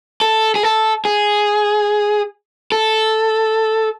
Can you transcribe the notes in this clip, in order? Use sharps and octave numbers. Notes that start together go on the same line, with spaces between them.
A4
G#4
A4
G#4
A4